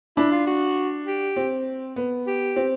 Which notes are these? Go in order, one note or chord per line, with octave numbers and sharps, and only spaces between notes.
D4 E4
F4
F#4
G4
C4
B3
G4
C4